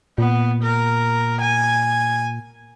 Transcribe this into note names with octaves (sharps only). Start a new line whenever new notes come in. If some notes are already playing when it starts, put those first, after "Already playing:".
A#2 B3
A#4
G#5